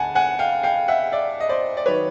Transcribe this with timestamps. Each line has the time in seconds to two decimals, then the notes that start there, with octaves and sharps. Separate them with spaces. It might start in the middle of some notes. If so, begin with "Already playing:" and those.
Already playing: D2 F#5 G#5 A5
0.15 F#5 G#5
0.39 F5 G5
0.63 F5 G5
0.88 E5 F#5
1.12 D5 E5
1.40 D#5
1.49 C5 D5
1.77 D5
1.86 D#3 F#3 B4 C#5